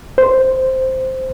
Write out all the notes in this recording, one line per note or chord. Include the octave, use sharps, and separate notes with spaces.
C5